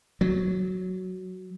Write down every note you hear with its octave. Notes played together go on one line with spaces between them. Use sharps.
F#3